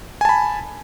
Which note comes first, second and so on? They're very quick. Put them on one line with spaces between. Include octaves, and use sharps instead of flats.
G#5 A5 B5